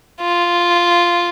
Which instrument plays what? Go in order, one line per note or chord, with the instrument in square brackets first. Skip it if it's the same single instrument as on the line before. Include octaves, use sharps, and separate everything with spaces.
[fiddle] F4